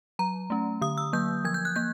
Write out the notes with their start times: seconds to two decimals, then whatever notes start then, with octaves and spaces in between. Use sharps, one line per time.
0.19 F#3 A#5
0.50 A3 C#4
0.82 D3 D#6
0.98 E6
1.13 F#3 A#3 G6
1.45 F3 G#6
1.54 G6
1.65 F#6
1.76 A#3 G6